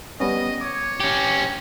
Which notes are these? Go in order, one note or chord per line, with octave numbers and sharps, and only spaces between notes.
G3 B3 C#4 D#5
C#5 D6
C#4 G4